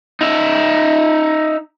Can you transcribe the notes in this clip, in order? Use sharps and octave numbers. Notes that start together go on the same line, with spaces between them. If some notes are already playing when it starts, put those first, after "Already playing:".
D#4 E5